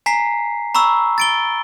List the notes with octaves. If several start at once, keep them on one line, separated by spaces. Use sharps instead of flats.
G#5 A#5 B6 C7
A#5 B5 C#6 E6
A6 D7 G7